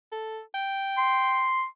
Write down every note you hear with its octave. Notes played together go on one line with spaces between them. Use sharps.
A4
G5
C6